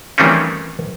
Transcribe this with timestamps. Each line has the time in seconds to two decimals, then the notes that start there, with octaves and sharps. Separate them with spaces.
0.18 D#3 E3 G3 A3 C4 C#4